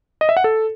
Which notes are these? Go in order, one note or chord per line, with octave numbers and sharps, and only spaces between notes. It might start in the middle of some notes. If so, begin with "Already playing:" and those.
D#5
E5
F#5
A4